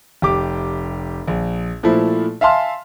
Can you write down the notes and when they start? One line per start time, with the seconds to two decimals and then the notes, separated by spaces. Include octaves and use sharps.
0.22 F1 G4 D6
1.27 A#1
1.83 A#2 F3 A3 E4
2.41 E5 F5 G#5 A5 C6 F6